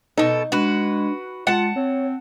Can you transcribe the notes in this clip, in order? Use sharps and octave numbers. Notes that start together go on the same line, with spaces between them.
B2 D#4 A4
G#3 D4 F#4 B4
G#3 F4 F#5 A5
C4 C#5